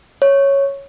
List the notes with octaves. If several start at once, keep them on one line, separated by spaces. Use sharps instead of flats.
C#5